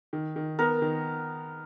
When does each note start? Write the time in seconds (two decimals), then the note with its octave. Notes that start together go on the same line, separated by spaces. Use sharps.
0.13 D#3
0.36 D#3
0.59 B3 A#4
0.82 D#3